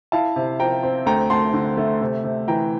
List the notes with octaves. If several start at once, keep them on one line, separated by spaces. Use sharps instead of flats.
E4 F5 A5
C3
F3 G5 A#5
C4
D2 G5 A#5
D2 A5 C6
D3
A3
C3
C3
E3 G5 A#5